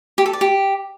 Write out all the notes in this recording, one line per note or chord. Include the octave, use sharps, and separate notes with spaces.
G4
A4
D5
G4